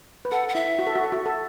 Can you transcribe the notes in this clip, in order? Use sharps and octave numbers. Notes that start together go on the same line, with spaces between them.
B4
A4 F#5
F#5
E4 E5
F#4
A4
F#4
A4
F#4
A4